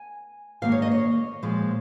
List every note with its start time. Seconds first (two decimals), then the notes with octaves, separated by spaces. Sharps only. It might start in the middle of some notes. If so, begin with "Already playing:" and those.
Already playing: G#5
0.62 G#2 D#3 A#3 F5
0.72 C#5
0.82 D#5
0.91 C#5
1.42 A#2 F3 G#3